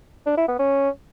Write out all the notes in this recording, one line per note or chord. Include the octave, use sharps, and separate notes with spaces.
D4
E4
B3
C#4